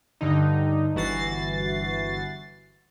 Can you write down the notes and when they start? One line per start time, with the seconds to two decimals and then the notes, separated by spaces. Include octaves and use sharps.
0.21 G2 D3 D#4
0.95 G1 E3 F#4 A6 C7